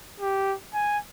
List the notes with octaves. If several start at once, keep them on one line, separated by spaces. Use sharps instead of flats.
G4
G#5